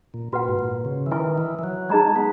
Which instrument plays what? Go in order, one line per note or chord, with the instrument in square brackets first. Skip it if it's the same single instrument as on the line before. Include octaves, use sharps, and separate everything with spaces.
[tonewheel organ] A#2
[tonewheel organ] A#2 [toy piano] F#4 B4 F#5
[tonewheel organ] G#2
A#2
C#3
E3
[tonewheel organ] D#3 [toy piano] E4 B4 E5 G#5 C#6
[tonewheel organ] E3
E3
F#3
[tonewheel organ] G#3 [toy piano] D#4 G#4 D#5 A#5 C#6
[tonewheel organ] B3